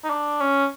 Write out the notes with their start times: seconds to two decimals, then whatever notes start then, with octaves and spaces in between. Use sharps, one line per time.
0.04 D#4
0.10 D4
0.40 C#4